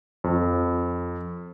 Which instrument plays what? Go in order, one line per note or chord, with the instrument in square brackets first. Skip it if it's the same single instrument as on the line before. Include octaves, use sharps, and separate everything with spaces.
[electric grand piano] F2